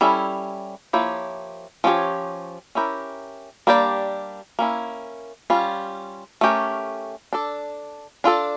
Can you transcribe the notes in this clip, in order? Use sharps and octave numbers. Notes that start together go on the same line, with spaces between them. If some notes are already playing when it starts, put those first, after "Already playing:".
G3 C#4 E4 A4
F3 A#3 E4 G4 C#5
F3 C#4 G4 C#5
C#4 E4 G4 A#4
G3 A#3 D4 G4 D5
A#3 C#4 E4
G3 C#4 F4
A3 C#4 G4 A#4
D4 A4 D5
D4 F4 A4 D5